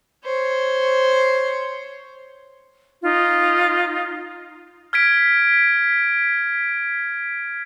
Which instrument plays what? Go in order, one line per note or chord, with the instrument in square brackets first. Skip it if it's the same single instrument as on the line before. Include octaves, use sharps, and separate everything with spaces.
[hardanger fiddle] C5 C#5
[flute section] D#4 F4
[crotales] F6 G#6 B6 D7